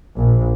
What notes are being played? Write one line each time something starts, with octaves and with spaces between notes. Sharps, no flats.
A#1